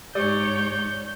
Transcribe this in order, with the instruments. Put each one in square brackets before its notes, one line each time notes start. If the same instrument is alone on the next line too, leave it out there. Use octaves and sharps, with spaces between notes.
[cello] G#2 C#5 [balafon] G4 [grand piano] D5 [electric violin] G6